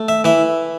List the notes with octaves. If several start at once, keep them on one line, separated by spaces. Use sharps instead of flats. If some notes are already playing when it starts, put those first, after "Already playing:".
Already playing: A3
E5
E3 E5